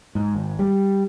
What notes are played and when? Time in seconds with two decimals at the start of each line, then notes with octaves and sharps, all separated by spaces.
0.15 G#2
0.35 G#1
0.59 G3